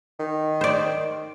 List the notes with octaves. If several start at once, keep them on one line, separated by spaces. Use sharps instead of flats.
D#3
C5 D5